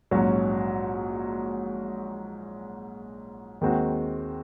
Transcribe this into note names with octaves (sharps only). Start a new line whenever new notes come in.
A#1 G#2 F#3 C#4
D#2 D#3 G#3 C4 F#4